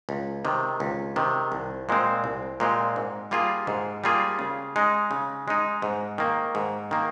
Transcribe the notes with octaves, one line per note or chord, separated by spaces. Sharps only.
C#2
C3 D#3
C#2
C3 D#3
C2
A#2 G#3 C4
C2
A#2 G#3 C4
G#2
G3 A#3 F4 G#4
G#2
G3 A#3 F4 G#4
C#3
G#3 D#4
C#3
G#3 D#4
G#2
D#3 A#3
G#2
D#3 A#3